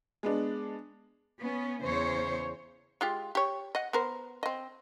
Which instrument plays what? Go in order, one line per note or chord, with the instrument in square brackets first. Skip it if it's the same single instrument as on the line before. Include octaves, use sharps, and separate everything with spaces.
[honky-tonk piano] G#3 B3 D4
[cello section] B3 C#4
E2 C#3 C5 C#5
[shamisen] G#3 F4 G4
G4 C#5
D#5 F#5
B3 A#4 C5
C4 D#5